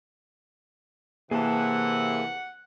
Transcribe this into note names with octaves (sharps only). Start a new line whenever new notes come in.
C3 E3 A#3 G#4 F#5 A5